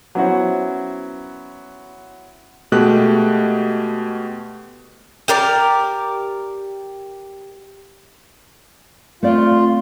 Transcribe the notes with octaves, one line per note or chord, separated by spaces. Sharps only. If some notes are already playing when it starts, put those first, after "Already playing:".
F#3 B3 C#4 E4 F#4 C5
B2 G#3 A3 G4 F#6
G4 A#4 D5
A3 C4 F4 D5